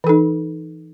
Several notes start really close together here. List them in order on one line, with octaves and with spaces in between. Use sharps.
E3 A4 D#4